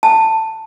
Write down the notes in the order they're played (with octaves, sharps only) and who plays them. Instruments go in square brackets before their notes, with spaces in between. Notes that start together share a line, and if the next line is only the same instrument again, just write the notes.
[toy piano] A5